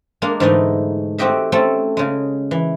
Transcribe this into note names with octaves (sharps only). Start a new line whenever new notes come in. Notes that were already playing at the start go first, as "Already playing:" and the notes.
G#3 A#3 D4
G#2 D3 E3 G#3 A3 D#4
A3 C4 F#4 G4 D#5 E5
A3 C4 C#4 A4
C#3 G#3
E3